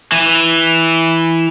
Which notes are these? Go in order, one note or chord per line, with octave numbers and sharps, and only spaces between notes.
E3